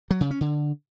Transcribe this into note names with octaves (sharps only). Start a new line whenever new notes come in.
F#3
C#3
C#4
D3